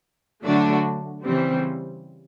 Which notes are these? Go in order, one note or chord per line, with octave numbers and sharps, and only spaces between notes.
D3 F#3 A3 D4 F#4
C#3 E3 G3 C4